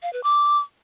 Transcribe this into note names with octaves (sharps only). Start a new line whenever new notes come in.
F5
B4
D6